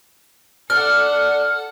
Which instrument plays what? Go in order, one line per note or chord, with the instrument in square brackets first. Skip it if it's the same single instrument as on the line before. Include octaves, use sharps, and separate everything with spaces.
[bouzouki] D4 [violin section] A4 F#5 [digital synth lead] F6